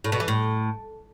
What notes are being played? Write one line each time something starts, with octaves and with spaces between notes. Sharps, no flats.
A2
B2
E3
A2